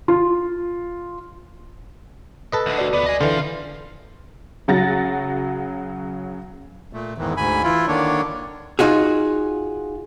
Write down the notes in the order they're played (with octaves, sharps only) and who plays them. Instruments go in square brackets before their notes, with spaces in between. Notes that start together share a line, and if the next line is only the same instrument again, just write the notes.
[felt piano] F4
[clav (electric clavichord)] A4 B4 D#5
[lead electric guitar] D2 D3
[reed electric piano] F#4 D5
[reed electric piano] D2 D5 [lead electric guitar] B3
[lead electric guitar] D#5 G#5
[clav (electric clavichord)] D3 E3 [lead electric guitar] F4 C5
[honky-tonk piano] C#3 F#3 F#5 A6 A#6
[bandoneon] A#2 A3
E2 G#2 D#3 E3
D2 G#2 G#5 B5
E3 E4 F4
D3 D#3 A#3 D4 C#5
[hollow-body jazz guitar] D#4 F4 F#4 G#4